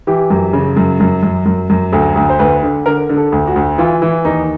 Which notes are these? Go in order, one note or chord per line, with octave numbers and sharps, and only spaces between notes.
E3 G4
F#2
C#3
F#2
F#2
F#2
F#2
F#2
D2 A4
D2
C5
D2 B4
D3
D3 A#4
D3
A4
D2
F#4
D2
E3 F4
E3
D#2 D#4